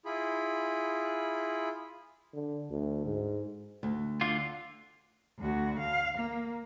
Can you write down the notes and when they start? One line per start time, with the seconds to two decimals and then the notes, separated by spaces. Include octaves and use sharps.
0.05 E4 F4 G#4 B5
2.34 D3
2.70 D2
3.06 G#2
3.83 D2
4.21 D3 F4
5.39 D2 F#4
5.79 F5
6.18 A#3